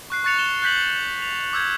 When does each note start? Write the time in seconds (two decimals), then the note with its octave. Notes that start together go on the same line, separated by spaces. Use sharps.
0.10 C#6 F#6 C7
0.24 C#6 F#6 A6 C#7 F7
0.39 E7 G7
0.62 F#6 G6 B6 F#7
1.22 F7
1.53 D6 E6 G6 G#6